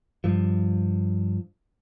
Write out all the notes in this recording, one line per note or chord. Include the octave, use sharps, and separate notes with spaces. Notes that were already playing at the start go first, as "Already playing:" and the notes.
G2 F3